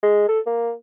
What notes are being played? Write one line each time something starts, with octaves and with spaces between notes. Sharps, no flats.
G#3
A4
A#3